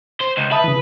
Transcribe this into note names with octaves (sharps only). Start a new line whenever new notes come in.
C5
C#2
B4 E5 A5 D#6
C#3 E3